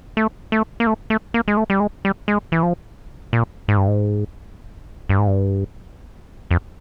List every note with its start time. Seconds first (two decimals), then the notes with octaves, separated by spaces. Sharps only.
0.17 A3
0.52 A3
0.80 A#3
0.87 A3
1.10 A3
1.34 A#3
1.48 G#3
1.57 A3
1.70 G3
1.80 G#3
2.05 G3
2.28 G#3
2.52 E3
2.63 F3
3.33 A#2
3.68 G#2
3.77 G2
3.88 G#2
5.09 G2
5.19 G#2
5.27 G2
6.51 F2